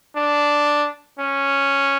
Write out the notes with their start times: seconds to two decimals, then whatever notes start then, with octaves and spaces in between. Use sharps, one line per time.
0.16 D4
1.19 C#4